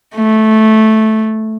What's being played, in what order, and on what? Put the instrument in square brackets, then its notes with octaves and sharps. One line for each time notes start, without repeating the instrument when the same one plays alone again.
[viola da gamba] A3